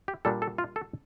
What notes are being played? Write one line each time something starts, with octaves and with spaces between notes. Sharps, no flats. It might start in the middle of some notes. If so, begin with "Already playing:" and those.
G4
A#2 G3 A#3 D4 A4
A4
F4
A4